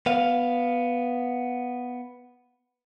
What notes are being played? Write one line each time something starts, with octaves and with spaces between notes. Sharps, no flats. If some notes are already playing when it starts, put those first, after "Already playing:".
B3 F5